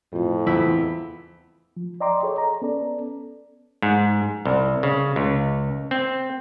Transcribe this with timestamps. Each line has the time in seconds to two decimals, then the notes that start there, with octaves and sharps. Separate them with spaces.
0.13 F2 A2 F3
0.47 E2 E4
1.77 F3
2.01 D5 D#5 G5 A#5 C6 D6
2.23 G#4 A4 C#5 D#5
2.38 A#5
2.62 B3 C#4 A4 D5
3.82 G#2
4.45 C2
4.83 C#3
5.16 C#2
5.91 C4